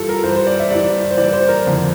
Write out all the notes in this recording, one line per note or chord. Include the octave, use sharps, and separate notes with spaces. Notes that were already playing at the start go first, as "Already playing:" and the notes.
Already playing: G2 E3 F4 A4
A#4
G2 E3 C5
C5
D5
E5
G2 E3 D5
C5
G2 E3 D5
C5
A#4
F2 D3 F3